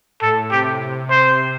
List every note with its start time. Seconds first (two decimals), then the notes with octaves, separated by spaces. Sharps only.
0.21 A2 A4
0.51 C3 G4
1.10 C3 C5